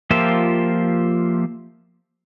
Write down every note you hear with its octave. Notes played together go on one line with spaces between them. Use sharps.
F3 A#3 F4 G4 E5